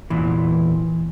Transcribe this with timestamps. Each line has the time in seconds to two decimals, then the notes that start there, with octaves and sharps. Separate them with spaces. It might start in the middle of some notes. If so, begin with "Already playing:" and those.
0.10 E2 A#2 E3